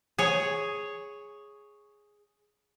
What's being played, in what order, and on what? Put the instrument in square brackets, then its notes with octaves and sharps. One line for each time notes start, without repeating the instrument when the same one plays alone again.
[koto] G#4 C#5